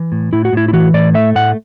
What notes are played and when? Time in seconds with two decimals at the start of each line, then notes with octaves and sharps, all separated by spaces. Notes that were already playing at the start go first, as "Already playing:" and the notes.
Already playing: E3
0.12 A2
0.33 A2 E4
0.45 F#4
0.53 A2 E4
0.68 E4
0.73 E3 F#4
0.94 A2 D5
1.14 A3 E5
1.36 A2 F#5